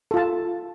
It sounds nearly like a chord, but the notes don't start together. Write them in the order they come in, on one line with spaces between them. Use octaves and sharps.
A4 F4 A5